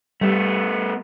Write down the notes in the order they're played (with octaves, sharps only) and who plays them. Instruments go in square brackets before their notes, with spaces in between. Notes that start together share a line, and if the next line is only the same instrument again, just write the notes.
[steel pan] G3 [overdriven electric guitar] A3 B3